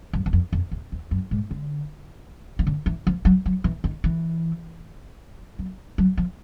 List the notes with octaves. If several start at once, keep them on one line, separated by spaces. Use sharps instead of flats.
F#2
E2
F2
F2
E2
E2
F#2
G#2
D3
D#3
D3
E3
F3
F#3
F#3
E3
D#3
E3
F#3
F#3
F3